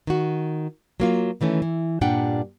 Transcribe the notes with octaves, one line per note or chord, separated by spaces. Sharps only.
D#3 F#4
F#3 A#3 F4
D#3 E3 A3 C#4
E3
G2 A#2 G3 D4 F#5 G5